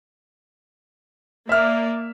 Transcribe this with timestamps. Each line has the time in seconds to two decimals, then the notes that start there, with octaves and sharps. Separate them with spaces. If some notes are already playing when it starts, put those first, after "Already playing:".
1.49 A#3 D5 E5 F6